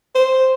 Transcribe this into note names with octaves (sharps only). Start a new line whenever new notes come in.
C5